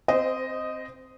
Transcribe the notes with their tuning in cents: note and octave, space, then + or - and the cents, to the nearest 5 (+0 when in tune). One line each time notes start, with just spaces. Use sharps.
C4 +0 C5 -25 D#5 +0